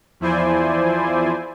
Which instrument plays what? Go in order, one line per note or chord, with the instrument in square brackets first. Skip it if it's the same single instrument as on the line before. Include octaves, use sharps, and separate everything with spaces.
[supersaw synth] E2 F3 E4 C5 D5 G#5